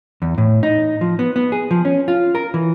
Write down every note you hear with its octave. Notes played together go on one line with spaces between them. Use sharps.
E2
A2
D#4
F3
B3
B3
G#4
F3
C#4
F4
A#4
E3